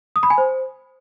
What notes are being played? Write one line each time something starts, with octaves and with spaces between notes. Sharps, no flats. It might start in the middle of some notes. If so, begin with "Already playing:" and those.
D#6
B5
G#5
C5